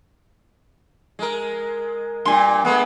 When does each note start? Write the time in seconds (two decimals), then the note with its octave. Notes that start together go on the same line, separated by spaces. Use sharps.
1.19 G#3 A#4
2.25 G2 A#2 G#5 C6
2.65 G#3 A3 B3 F#5